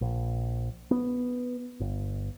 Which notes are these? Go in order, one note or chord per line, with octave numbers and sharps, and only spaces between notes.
A#1
B3
G1